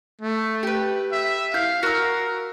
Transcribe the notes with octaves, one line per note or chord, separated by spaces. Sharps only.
A3
G4 B4
E5
E4 F5 G6
F#4 A#4 E6